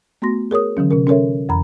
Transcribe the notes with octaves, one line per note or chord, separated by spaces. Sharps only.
A3 B3 F#4 C6 A#6
G#4 A#4 C#5 D#6
D3 E3 F#3 C#4
C3 C#4 A#4
C#4 A4 A#4 C#5 E5
F2 E3 A#5 B5